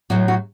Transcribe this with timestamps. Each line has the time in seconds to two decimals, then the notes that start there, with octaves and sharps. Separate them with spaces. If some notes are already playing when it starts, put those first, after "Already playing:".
0.10 A2 F#3 F#4
0.28 F#4